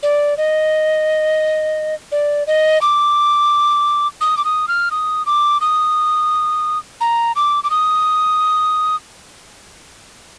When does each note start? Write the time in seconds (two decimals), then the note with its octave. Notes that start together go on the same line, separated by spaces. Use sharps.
0.03 D5
0.38 D#5
2.12 D5
2.47 D#5
2.82 D6
4.21 D#6
4.37 D6
4.45 D#6
4.68 F6
4.91 D#6
5.26 D6
5.61 D#6
7.01 A#5
7.36 D6
7.64 D6
7.70 D#6